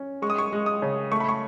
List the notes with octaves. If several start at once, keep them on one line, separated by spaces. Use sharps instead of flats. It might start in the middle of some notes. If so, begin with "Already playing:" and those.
Already playing: C#4
G#3 C#6
D#6
C#6
G#3
D#6
C#3
A3 C#6
B5
C#6